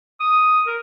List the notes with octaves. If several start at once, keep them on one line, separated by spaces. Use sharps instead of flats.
D#6
A#4